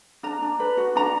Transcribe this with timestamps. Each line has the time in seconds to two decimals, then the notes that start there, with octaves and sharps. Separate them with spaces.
0.23 D4 A#5
0.42 D4
0.60 B4
0.77 F#4
0.96 D4 A#5